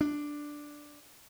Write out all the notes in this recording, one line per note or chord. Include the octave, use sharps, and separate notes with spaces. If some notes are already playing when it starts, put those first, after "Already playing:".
D4